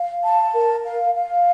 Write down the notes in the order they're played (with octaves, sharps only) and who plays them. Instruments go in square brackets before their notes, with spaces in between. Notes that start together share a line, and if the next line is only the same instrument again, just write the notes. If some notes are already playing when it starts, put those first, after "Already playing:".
Already playing: [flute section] F5
A5
A#4
F5
F5